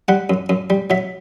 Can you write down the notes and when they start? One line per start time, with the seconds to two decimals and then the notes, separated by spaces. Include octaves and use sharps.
0.08 G3 F#5
0.30 F#2
0.49 F#2
0.70 G3
0.90 F#3 E5